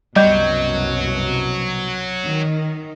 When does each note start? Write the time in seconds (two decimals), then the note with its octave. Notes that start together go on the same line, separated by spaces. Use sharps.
0.16 C2 F#2 B2 F#3 G3 D#5 G6
2.25 D#3